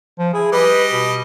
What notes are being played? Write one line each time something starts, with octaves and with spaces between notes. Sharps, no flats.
F3
E4 G#4
G3 B4 D#5
B2